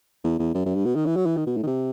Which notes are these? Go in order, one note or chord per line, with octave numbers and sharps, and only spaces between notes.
E2
E2
F#2
F#2
G2
B2
D#3
E3
F#3
E3
D#3
B2
A2
D#3
C3